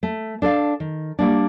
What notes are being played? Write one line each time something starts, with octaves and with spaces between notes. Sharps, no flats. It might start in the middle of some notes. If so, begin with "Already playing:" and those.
A3
D4 A4 D5 F5
D#3
G3 A#3 D4